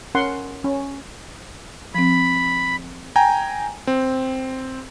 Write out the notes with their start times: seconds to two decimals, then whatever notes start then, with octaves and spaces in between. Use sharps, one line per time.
0.15 C#4 A#4 F#5 C6
0.64 C#4
1.95 F3 C4 B5
3.16 G5 G#5 A#5
3.87 C4